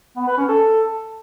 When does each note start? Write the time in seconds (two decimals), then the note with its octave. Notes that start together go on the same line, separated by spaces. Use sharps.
0.16 B3
0.27 B4
0.37 C#4
0.48 A4